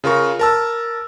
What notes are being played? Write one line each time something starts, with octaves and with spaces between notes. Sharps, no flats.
C#3 F4 A#4 C#6
A#4 A5 E6